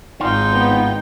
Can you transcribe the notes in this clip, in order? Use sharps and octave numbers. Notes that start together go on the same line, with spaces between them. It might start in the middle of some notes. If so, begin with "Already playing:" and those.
G#1 G#3 D#4 F4 G5
B3